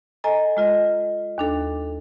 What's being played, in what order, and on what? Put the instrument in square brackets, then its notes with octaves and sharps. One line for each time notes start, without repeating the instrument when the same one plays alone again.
[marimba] A4 D#5 G#5 A#5
G#3 F4 D#5
D#2 D4 A4